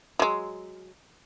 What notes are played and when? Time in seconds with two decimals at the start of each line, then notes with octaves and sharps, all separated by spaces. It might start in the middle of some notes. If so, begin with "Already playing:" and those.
0.19 F#3 G#3